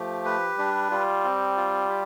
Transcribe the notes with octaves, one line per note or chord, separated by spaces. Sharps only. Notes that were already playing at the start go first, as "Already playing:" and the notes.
Already playing: F3 A3 G4
B4
G3 D4
G3 F4
C4
F4
G4